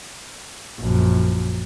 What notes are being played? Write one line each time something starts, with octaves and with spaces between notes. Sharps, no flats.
A#1 F#2